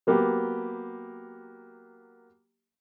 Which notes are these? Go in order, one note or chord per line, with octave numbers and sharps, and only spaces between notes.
F#3 A#3 B3 G4